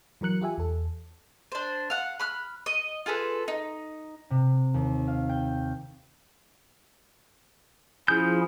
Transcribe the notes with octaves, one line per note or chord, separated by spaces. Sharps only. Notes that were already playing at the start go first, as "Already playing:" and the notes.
E3 F#3 A#4 F#6 C#7
F4 G4 E5 G#5
E2 A4
D4 C5
F5 F#5
B5 F6 F#6
D#5
F4 G#4 A4 B4
D#4
C3
D#2
F5
G5
F3 C#4 E4 G#4 G6